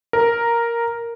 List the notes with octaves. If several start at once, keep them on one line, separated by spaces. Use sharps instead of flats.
A#4